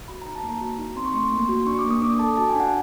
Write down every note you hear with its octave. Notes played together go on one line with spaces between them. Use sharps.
F#4 B5
D#4 A#5
A5
A#3
A#5
F#4
D#4
C4 C6
C#6
A3 C6
A#3
F#4
D4 C#6
D6
A#3
D#6
D4 D6
A4 A5
F#4 A5
G#5
D4 F#5